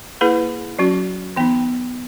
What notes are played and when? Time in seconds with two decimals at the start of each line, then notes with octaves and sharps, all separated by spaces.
0.21 A#3 E4 G#4 B4
0.79 F#3 C#4 F#4
1.36 E3 B3 D#4